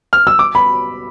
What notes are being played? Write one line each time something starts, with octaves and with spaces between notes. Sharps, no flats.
F6
E6
D6
B5